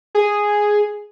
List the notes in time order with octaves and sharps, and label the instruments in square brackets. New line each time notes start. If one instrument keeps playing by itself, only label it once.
[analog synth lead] G#4